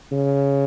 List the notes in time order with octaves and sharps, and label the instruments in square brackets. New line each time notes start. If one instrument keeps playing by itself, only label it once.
[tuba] C#3